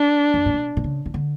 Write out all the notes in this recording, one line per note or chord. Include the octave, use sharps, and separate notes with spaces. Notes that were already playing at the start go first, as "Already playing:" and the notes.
Already playing: D4
F#2
A2
B2
B2
C#3
E3
D3